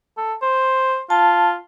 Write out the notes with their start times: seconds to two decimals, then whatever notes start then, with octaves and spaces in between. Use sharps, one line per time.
0.18 A4
0.42 C5
1.10 F4 A5